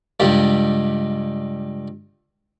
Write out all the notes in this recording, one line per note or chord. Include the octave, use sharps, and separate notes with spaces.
C#2 G2 G3